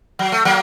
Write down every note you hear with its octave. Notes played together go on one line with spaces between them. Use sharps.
F#3
A3
F#3 A#3